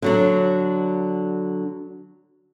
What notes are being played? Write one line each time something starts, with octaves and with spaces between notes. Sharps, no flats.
D3 F#3 D4